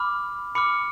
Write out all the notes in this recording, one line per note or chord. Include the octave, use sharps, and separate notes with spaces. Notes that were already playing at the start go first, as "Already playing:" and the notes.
Already playing: B5 D6 F6
B5 D6 F6 C#7